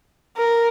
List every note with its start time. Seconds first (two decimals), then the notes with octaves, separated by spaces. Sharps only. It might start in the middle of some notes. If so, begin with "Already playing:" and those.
0.37 A#4